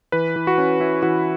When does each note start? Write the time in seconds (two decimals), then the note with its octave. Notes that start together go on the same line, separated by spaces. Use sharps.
0.12 E3 B4
0.36 E3
0.47 F#4
0.58 C#4
0.80 C#4 E4
1.03 E3 F#4